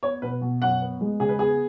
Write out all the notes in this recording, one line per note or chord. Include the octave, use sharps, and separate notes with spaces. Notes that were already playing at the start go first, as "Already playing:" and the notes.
B3 C#5
B2 B4
B2
F#2 F#5
B3
G#3
C#3 G#4
B4
B3 G#4